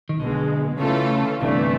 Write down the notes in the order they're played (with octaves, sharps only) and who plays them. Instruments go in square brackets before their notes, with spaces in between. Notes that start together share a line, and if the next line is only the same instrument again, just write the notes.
[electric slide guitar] D#3
[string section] B1 B2 G#3 [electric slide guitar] D3
[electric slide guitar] C#3 [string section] E3 A3 C#4 F4 A4
[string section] G1 G2 E3 A3 D4 [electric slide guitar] C3